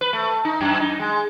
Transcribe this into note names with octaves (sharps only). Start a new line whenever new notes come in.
B4
A3
D#4
F#2
D#4
G#3